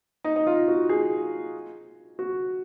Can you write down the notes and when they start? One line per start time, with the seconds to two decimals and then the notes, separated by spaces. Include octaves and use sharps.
0.24 D#4
0.36 D#4
0.47 F4
0.68 F#4
0.89 G#4
2.19 F#4